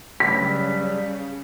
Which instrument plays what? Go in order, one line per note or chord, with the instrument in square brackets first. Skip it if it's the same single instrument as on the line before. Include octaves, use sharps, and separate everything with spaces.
[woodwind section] G2 F#3 G3 [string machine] C#3 [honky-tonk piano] B6